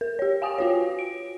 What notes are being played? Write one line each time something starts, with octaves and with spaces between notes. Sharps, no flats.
A#4
G4 C#5
F5 G5 G#5 D#6
F4 F#4 C#5
D7